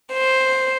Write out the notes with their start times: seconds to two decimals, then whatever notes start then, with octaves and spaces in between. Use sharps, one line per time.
0.14 C5